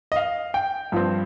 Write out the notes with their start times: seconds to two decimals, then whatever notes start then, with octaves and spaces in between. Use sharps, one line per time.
0.12 D#5
0.16 F5
0.54 G5
0.92 G2 F3 C4